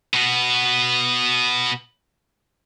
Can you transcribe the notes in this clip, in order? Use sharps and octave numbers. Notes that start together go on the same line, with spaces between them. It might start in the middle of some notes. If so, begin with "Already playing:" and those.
B2 B3